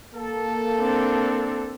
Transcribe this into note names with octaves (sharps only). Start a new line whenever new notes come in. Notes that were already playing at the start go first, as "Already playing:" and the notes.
A#3 A4
C4 D4